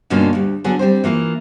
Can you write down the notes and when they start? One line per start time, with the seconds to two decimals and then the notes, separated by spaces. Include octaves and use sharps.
0.10 G2 B2 D3 A#3 C#4 F4
0.33 D2 G3
0.64 D3 F#3 B3 G#4
0.79 G3 C4 C5
1.04 E3 A#3 F4